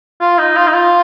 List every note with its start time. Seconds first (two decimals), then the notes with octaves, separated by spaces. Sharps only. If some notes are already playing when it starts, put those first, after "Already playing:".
0.21 F4
0.39 D#4
0.57 F4
0.67 D#4
0.74 F4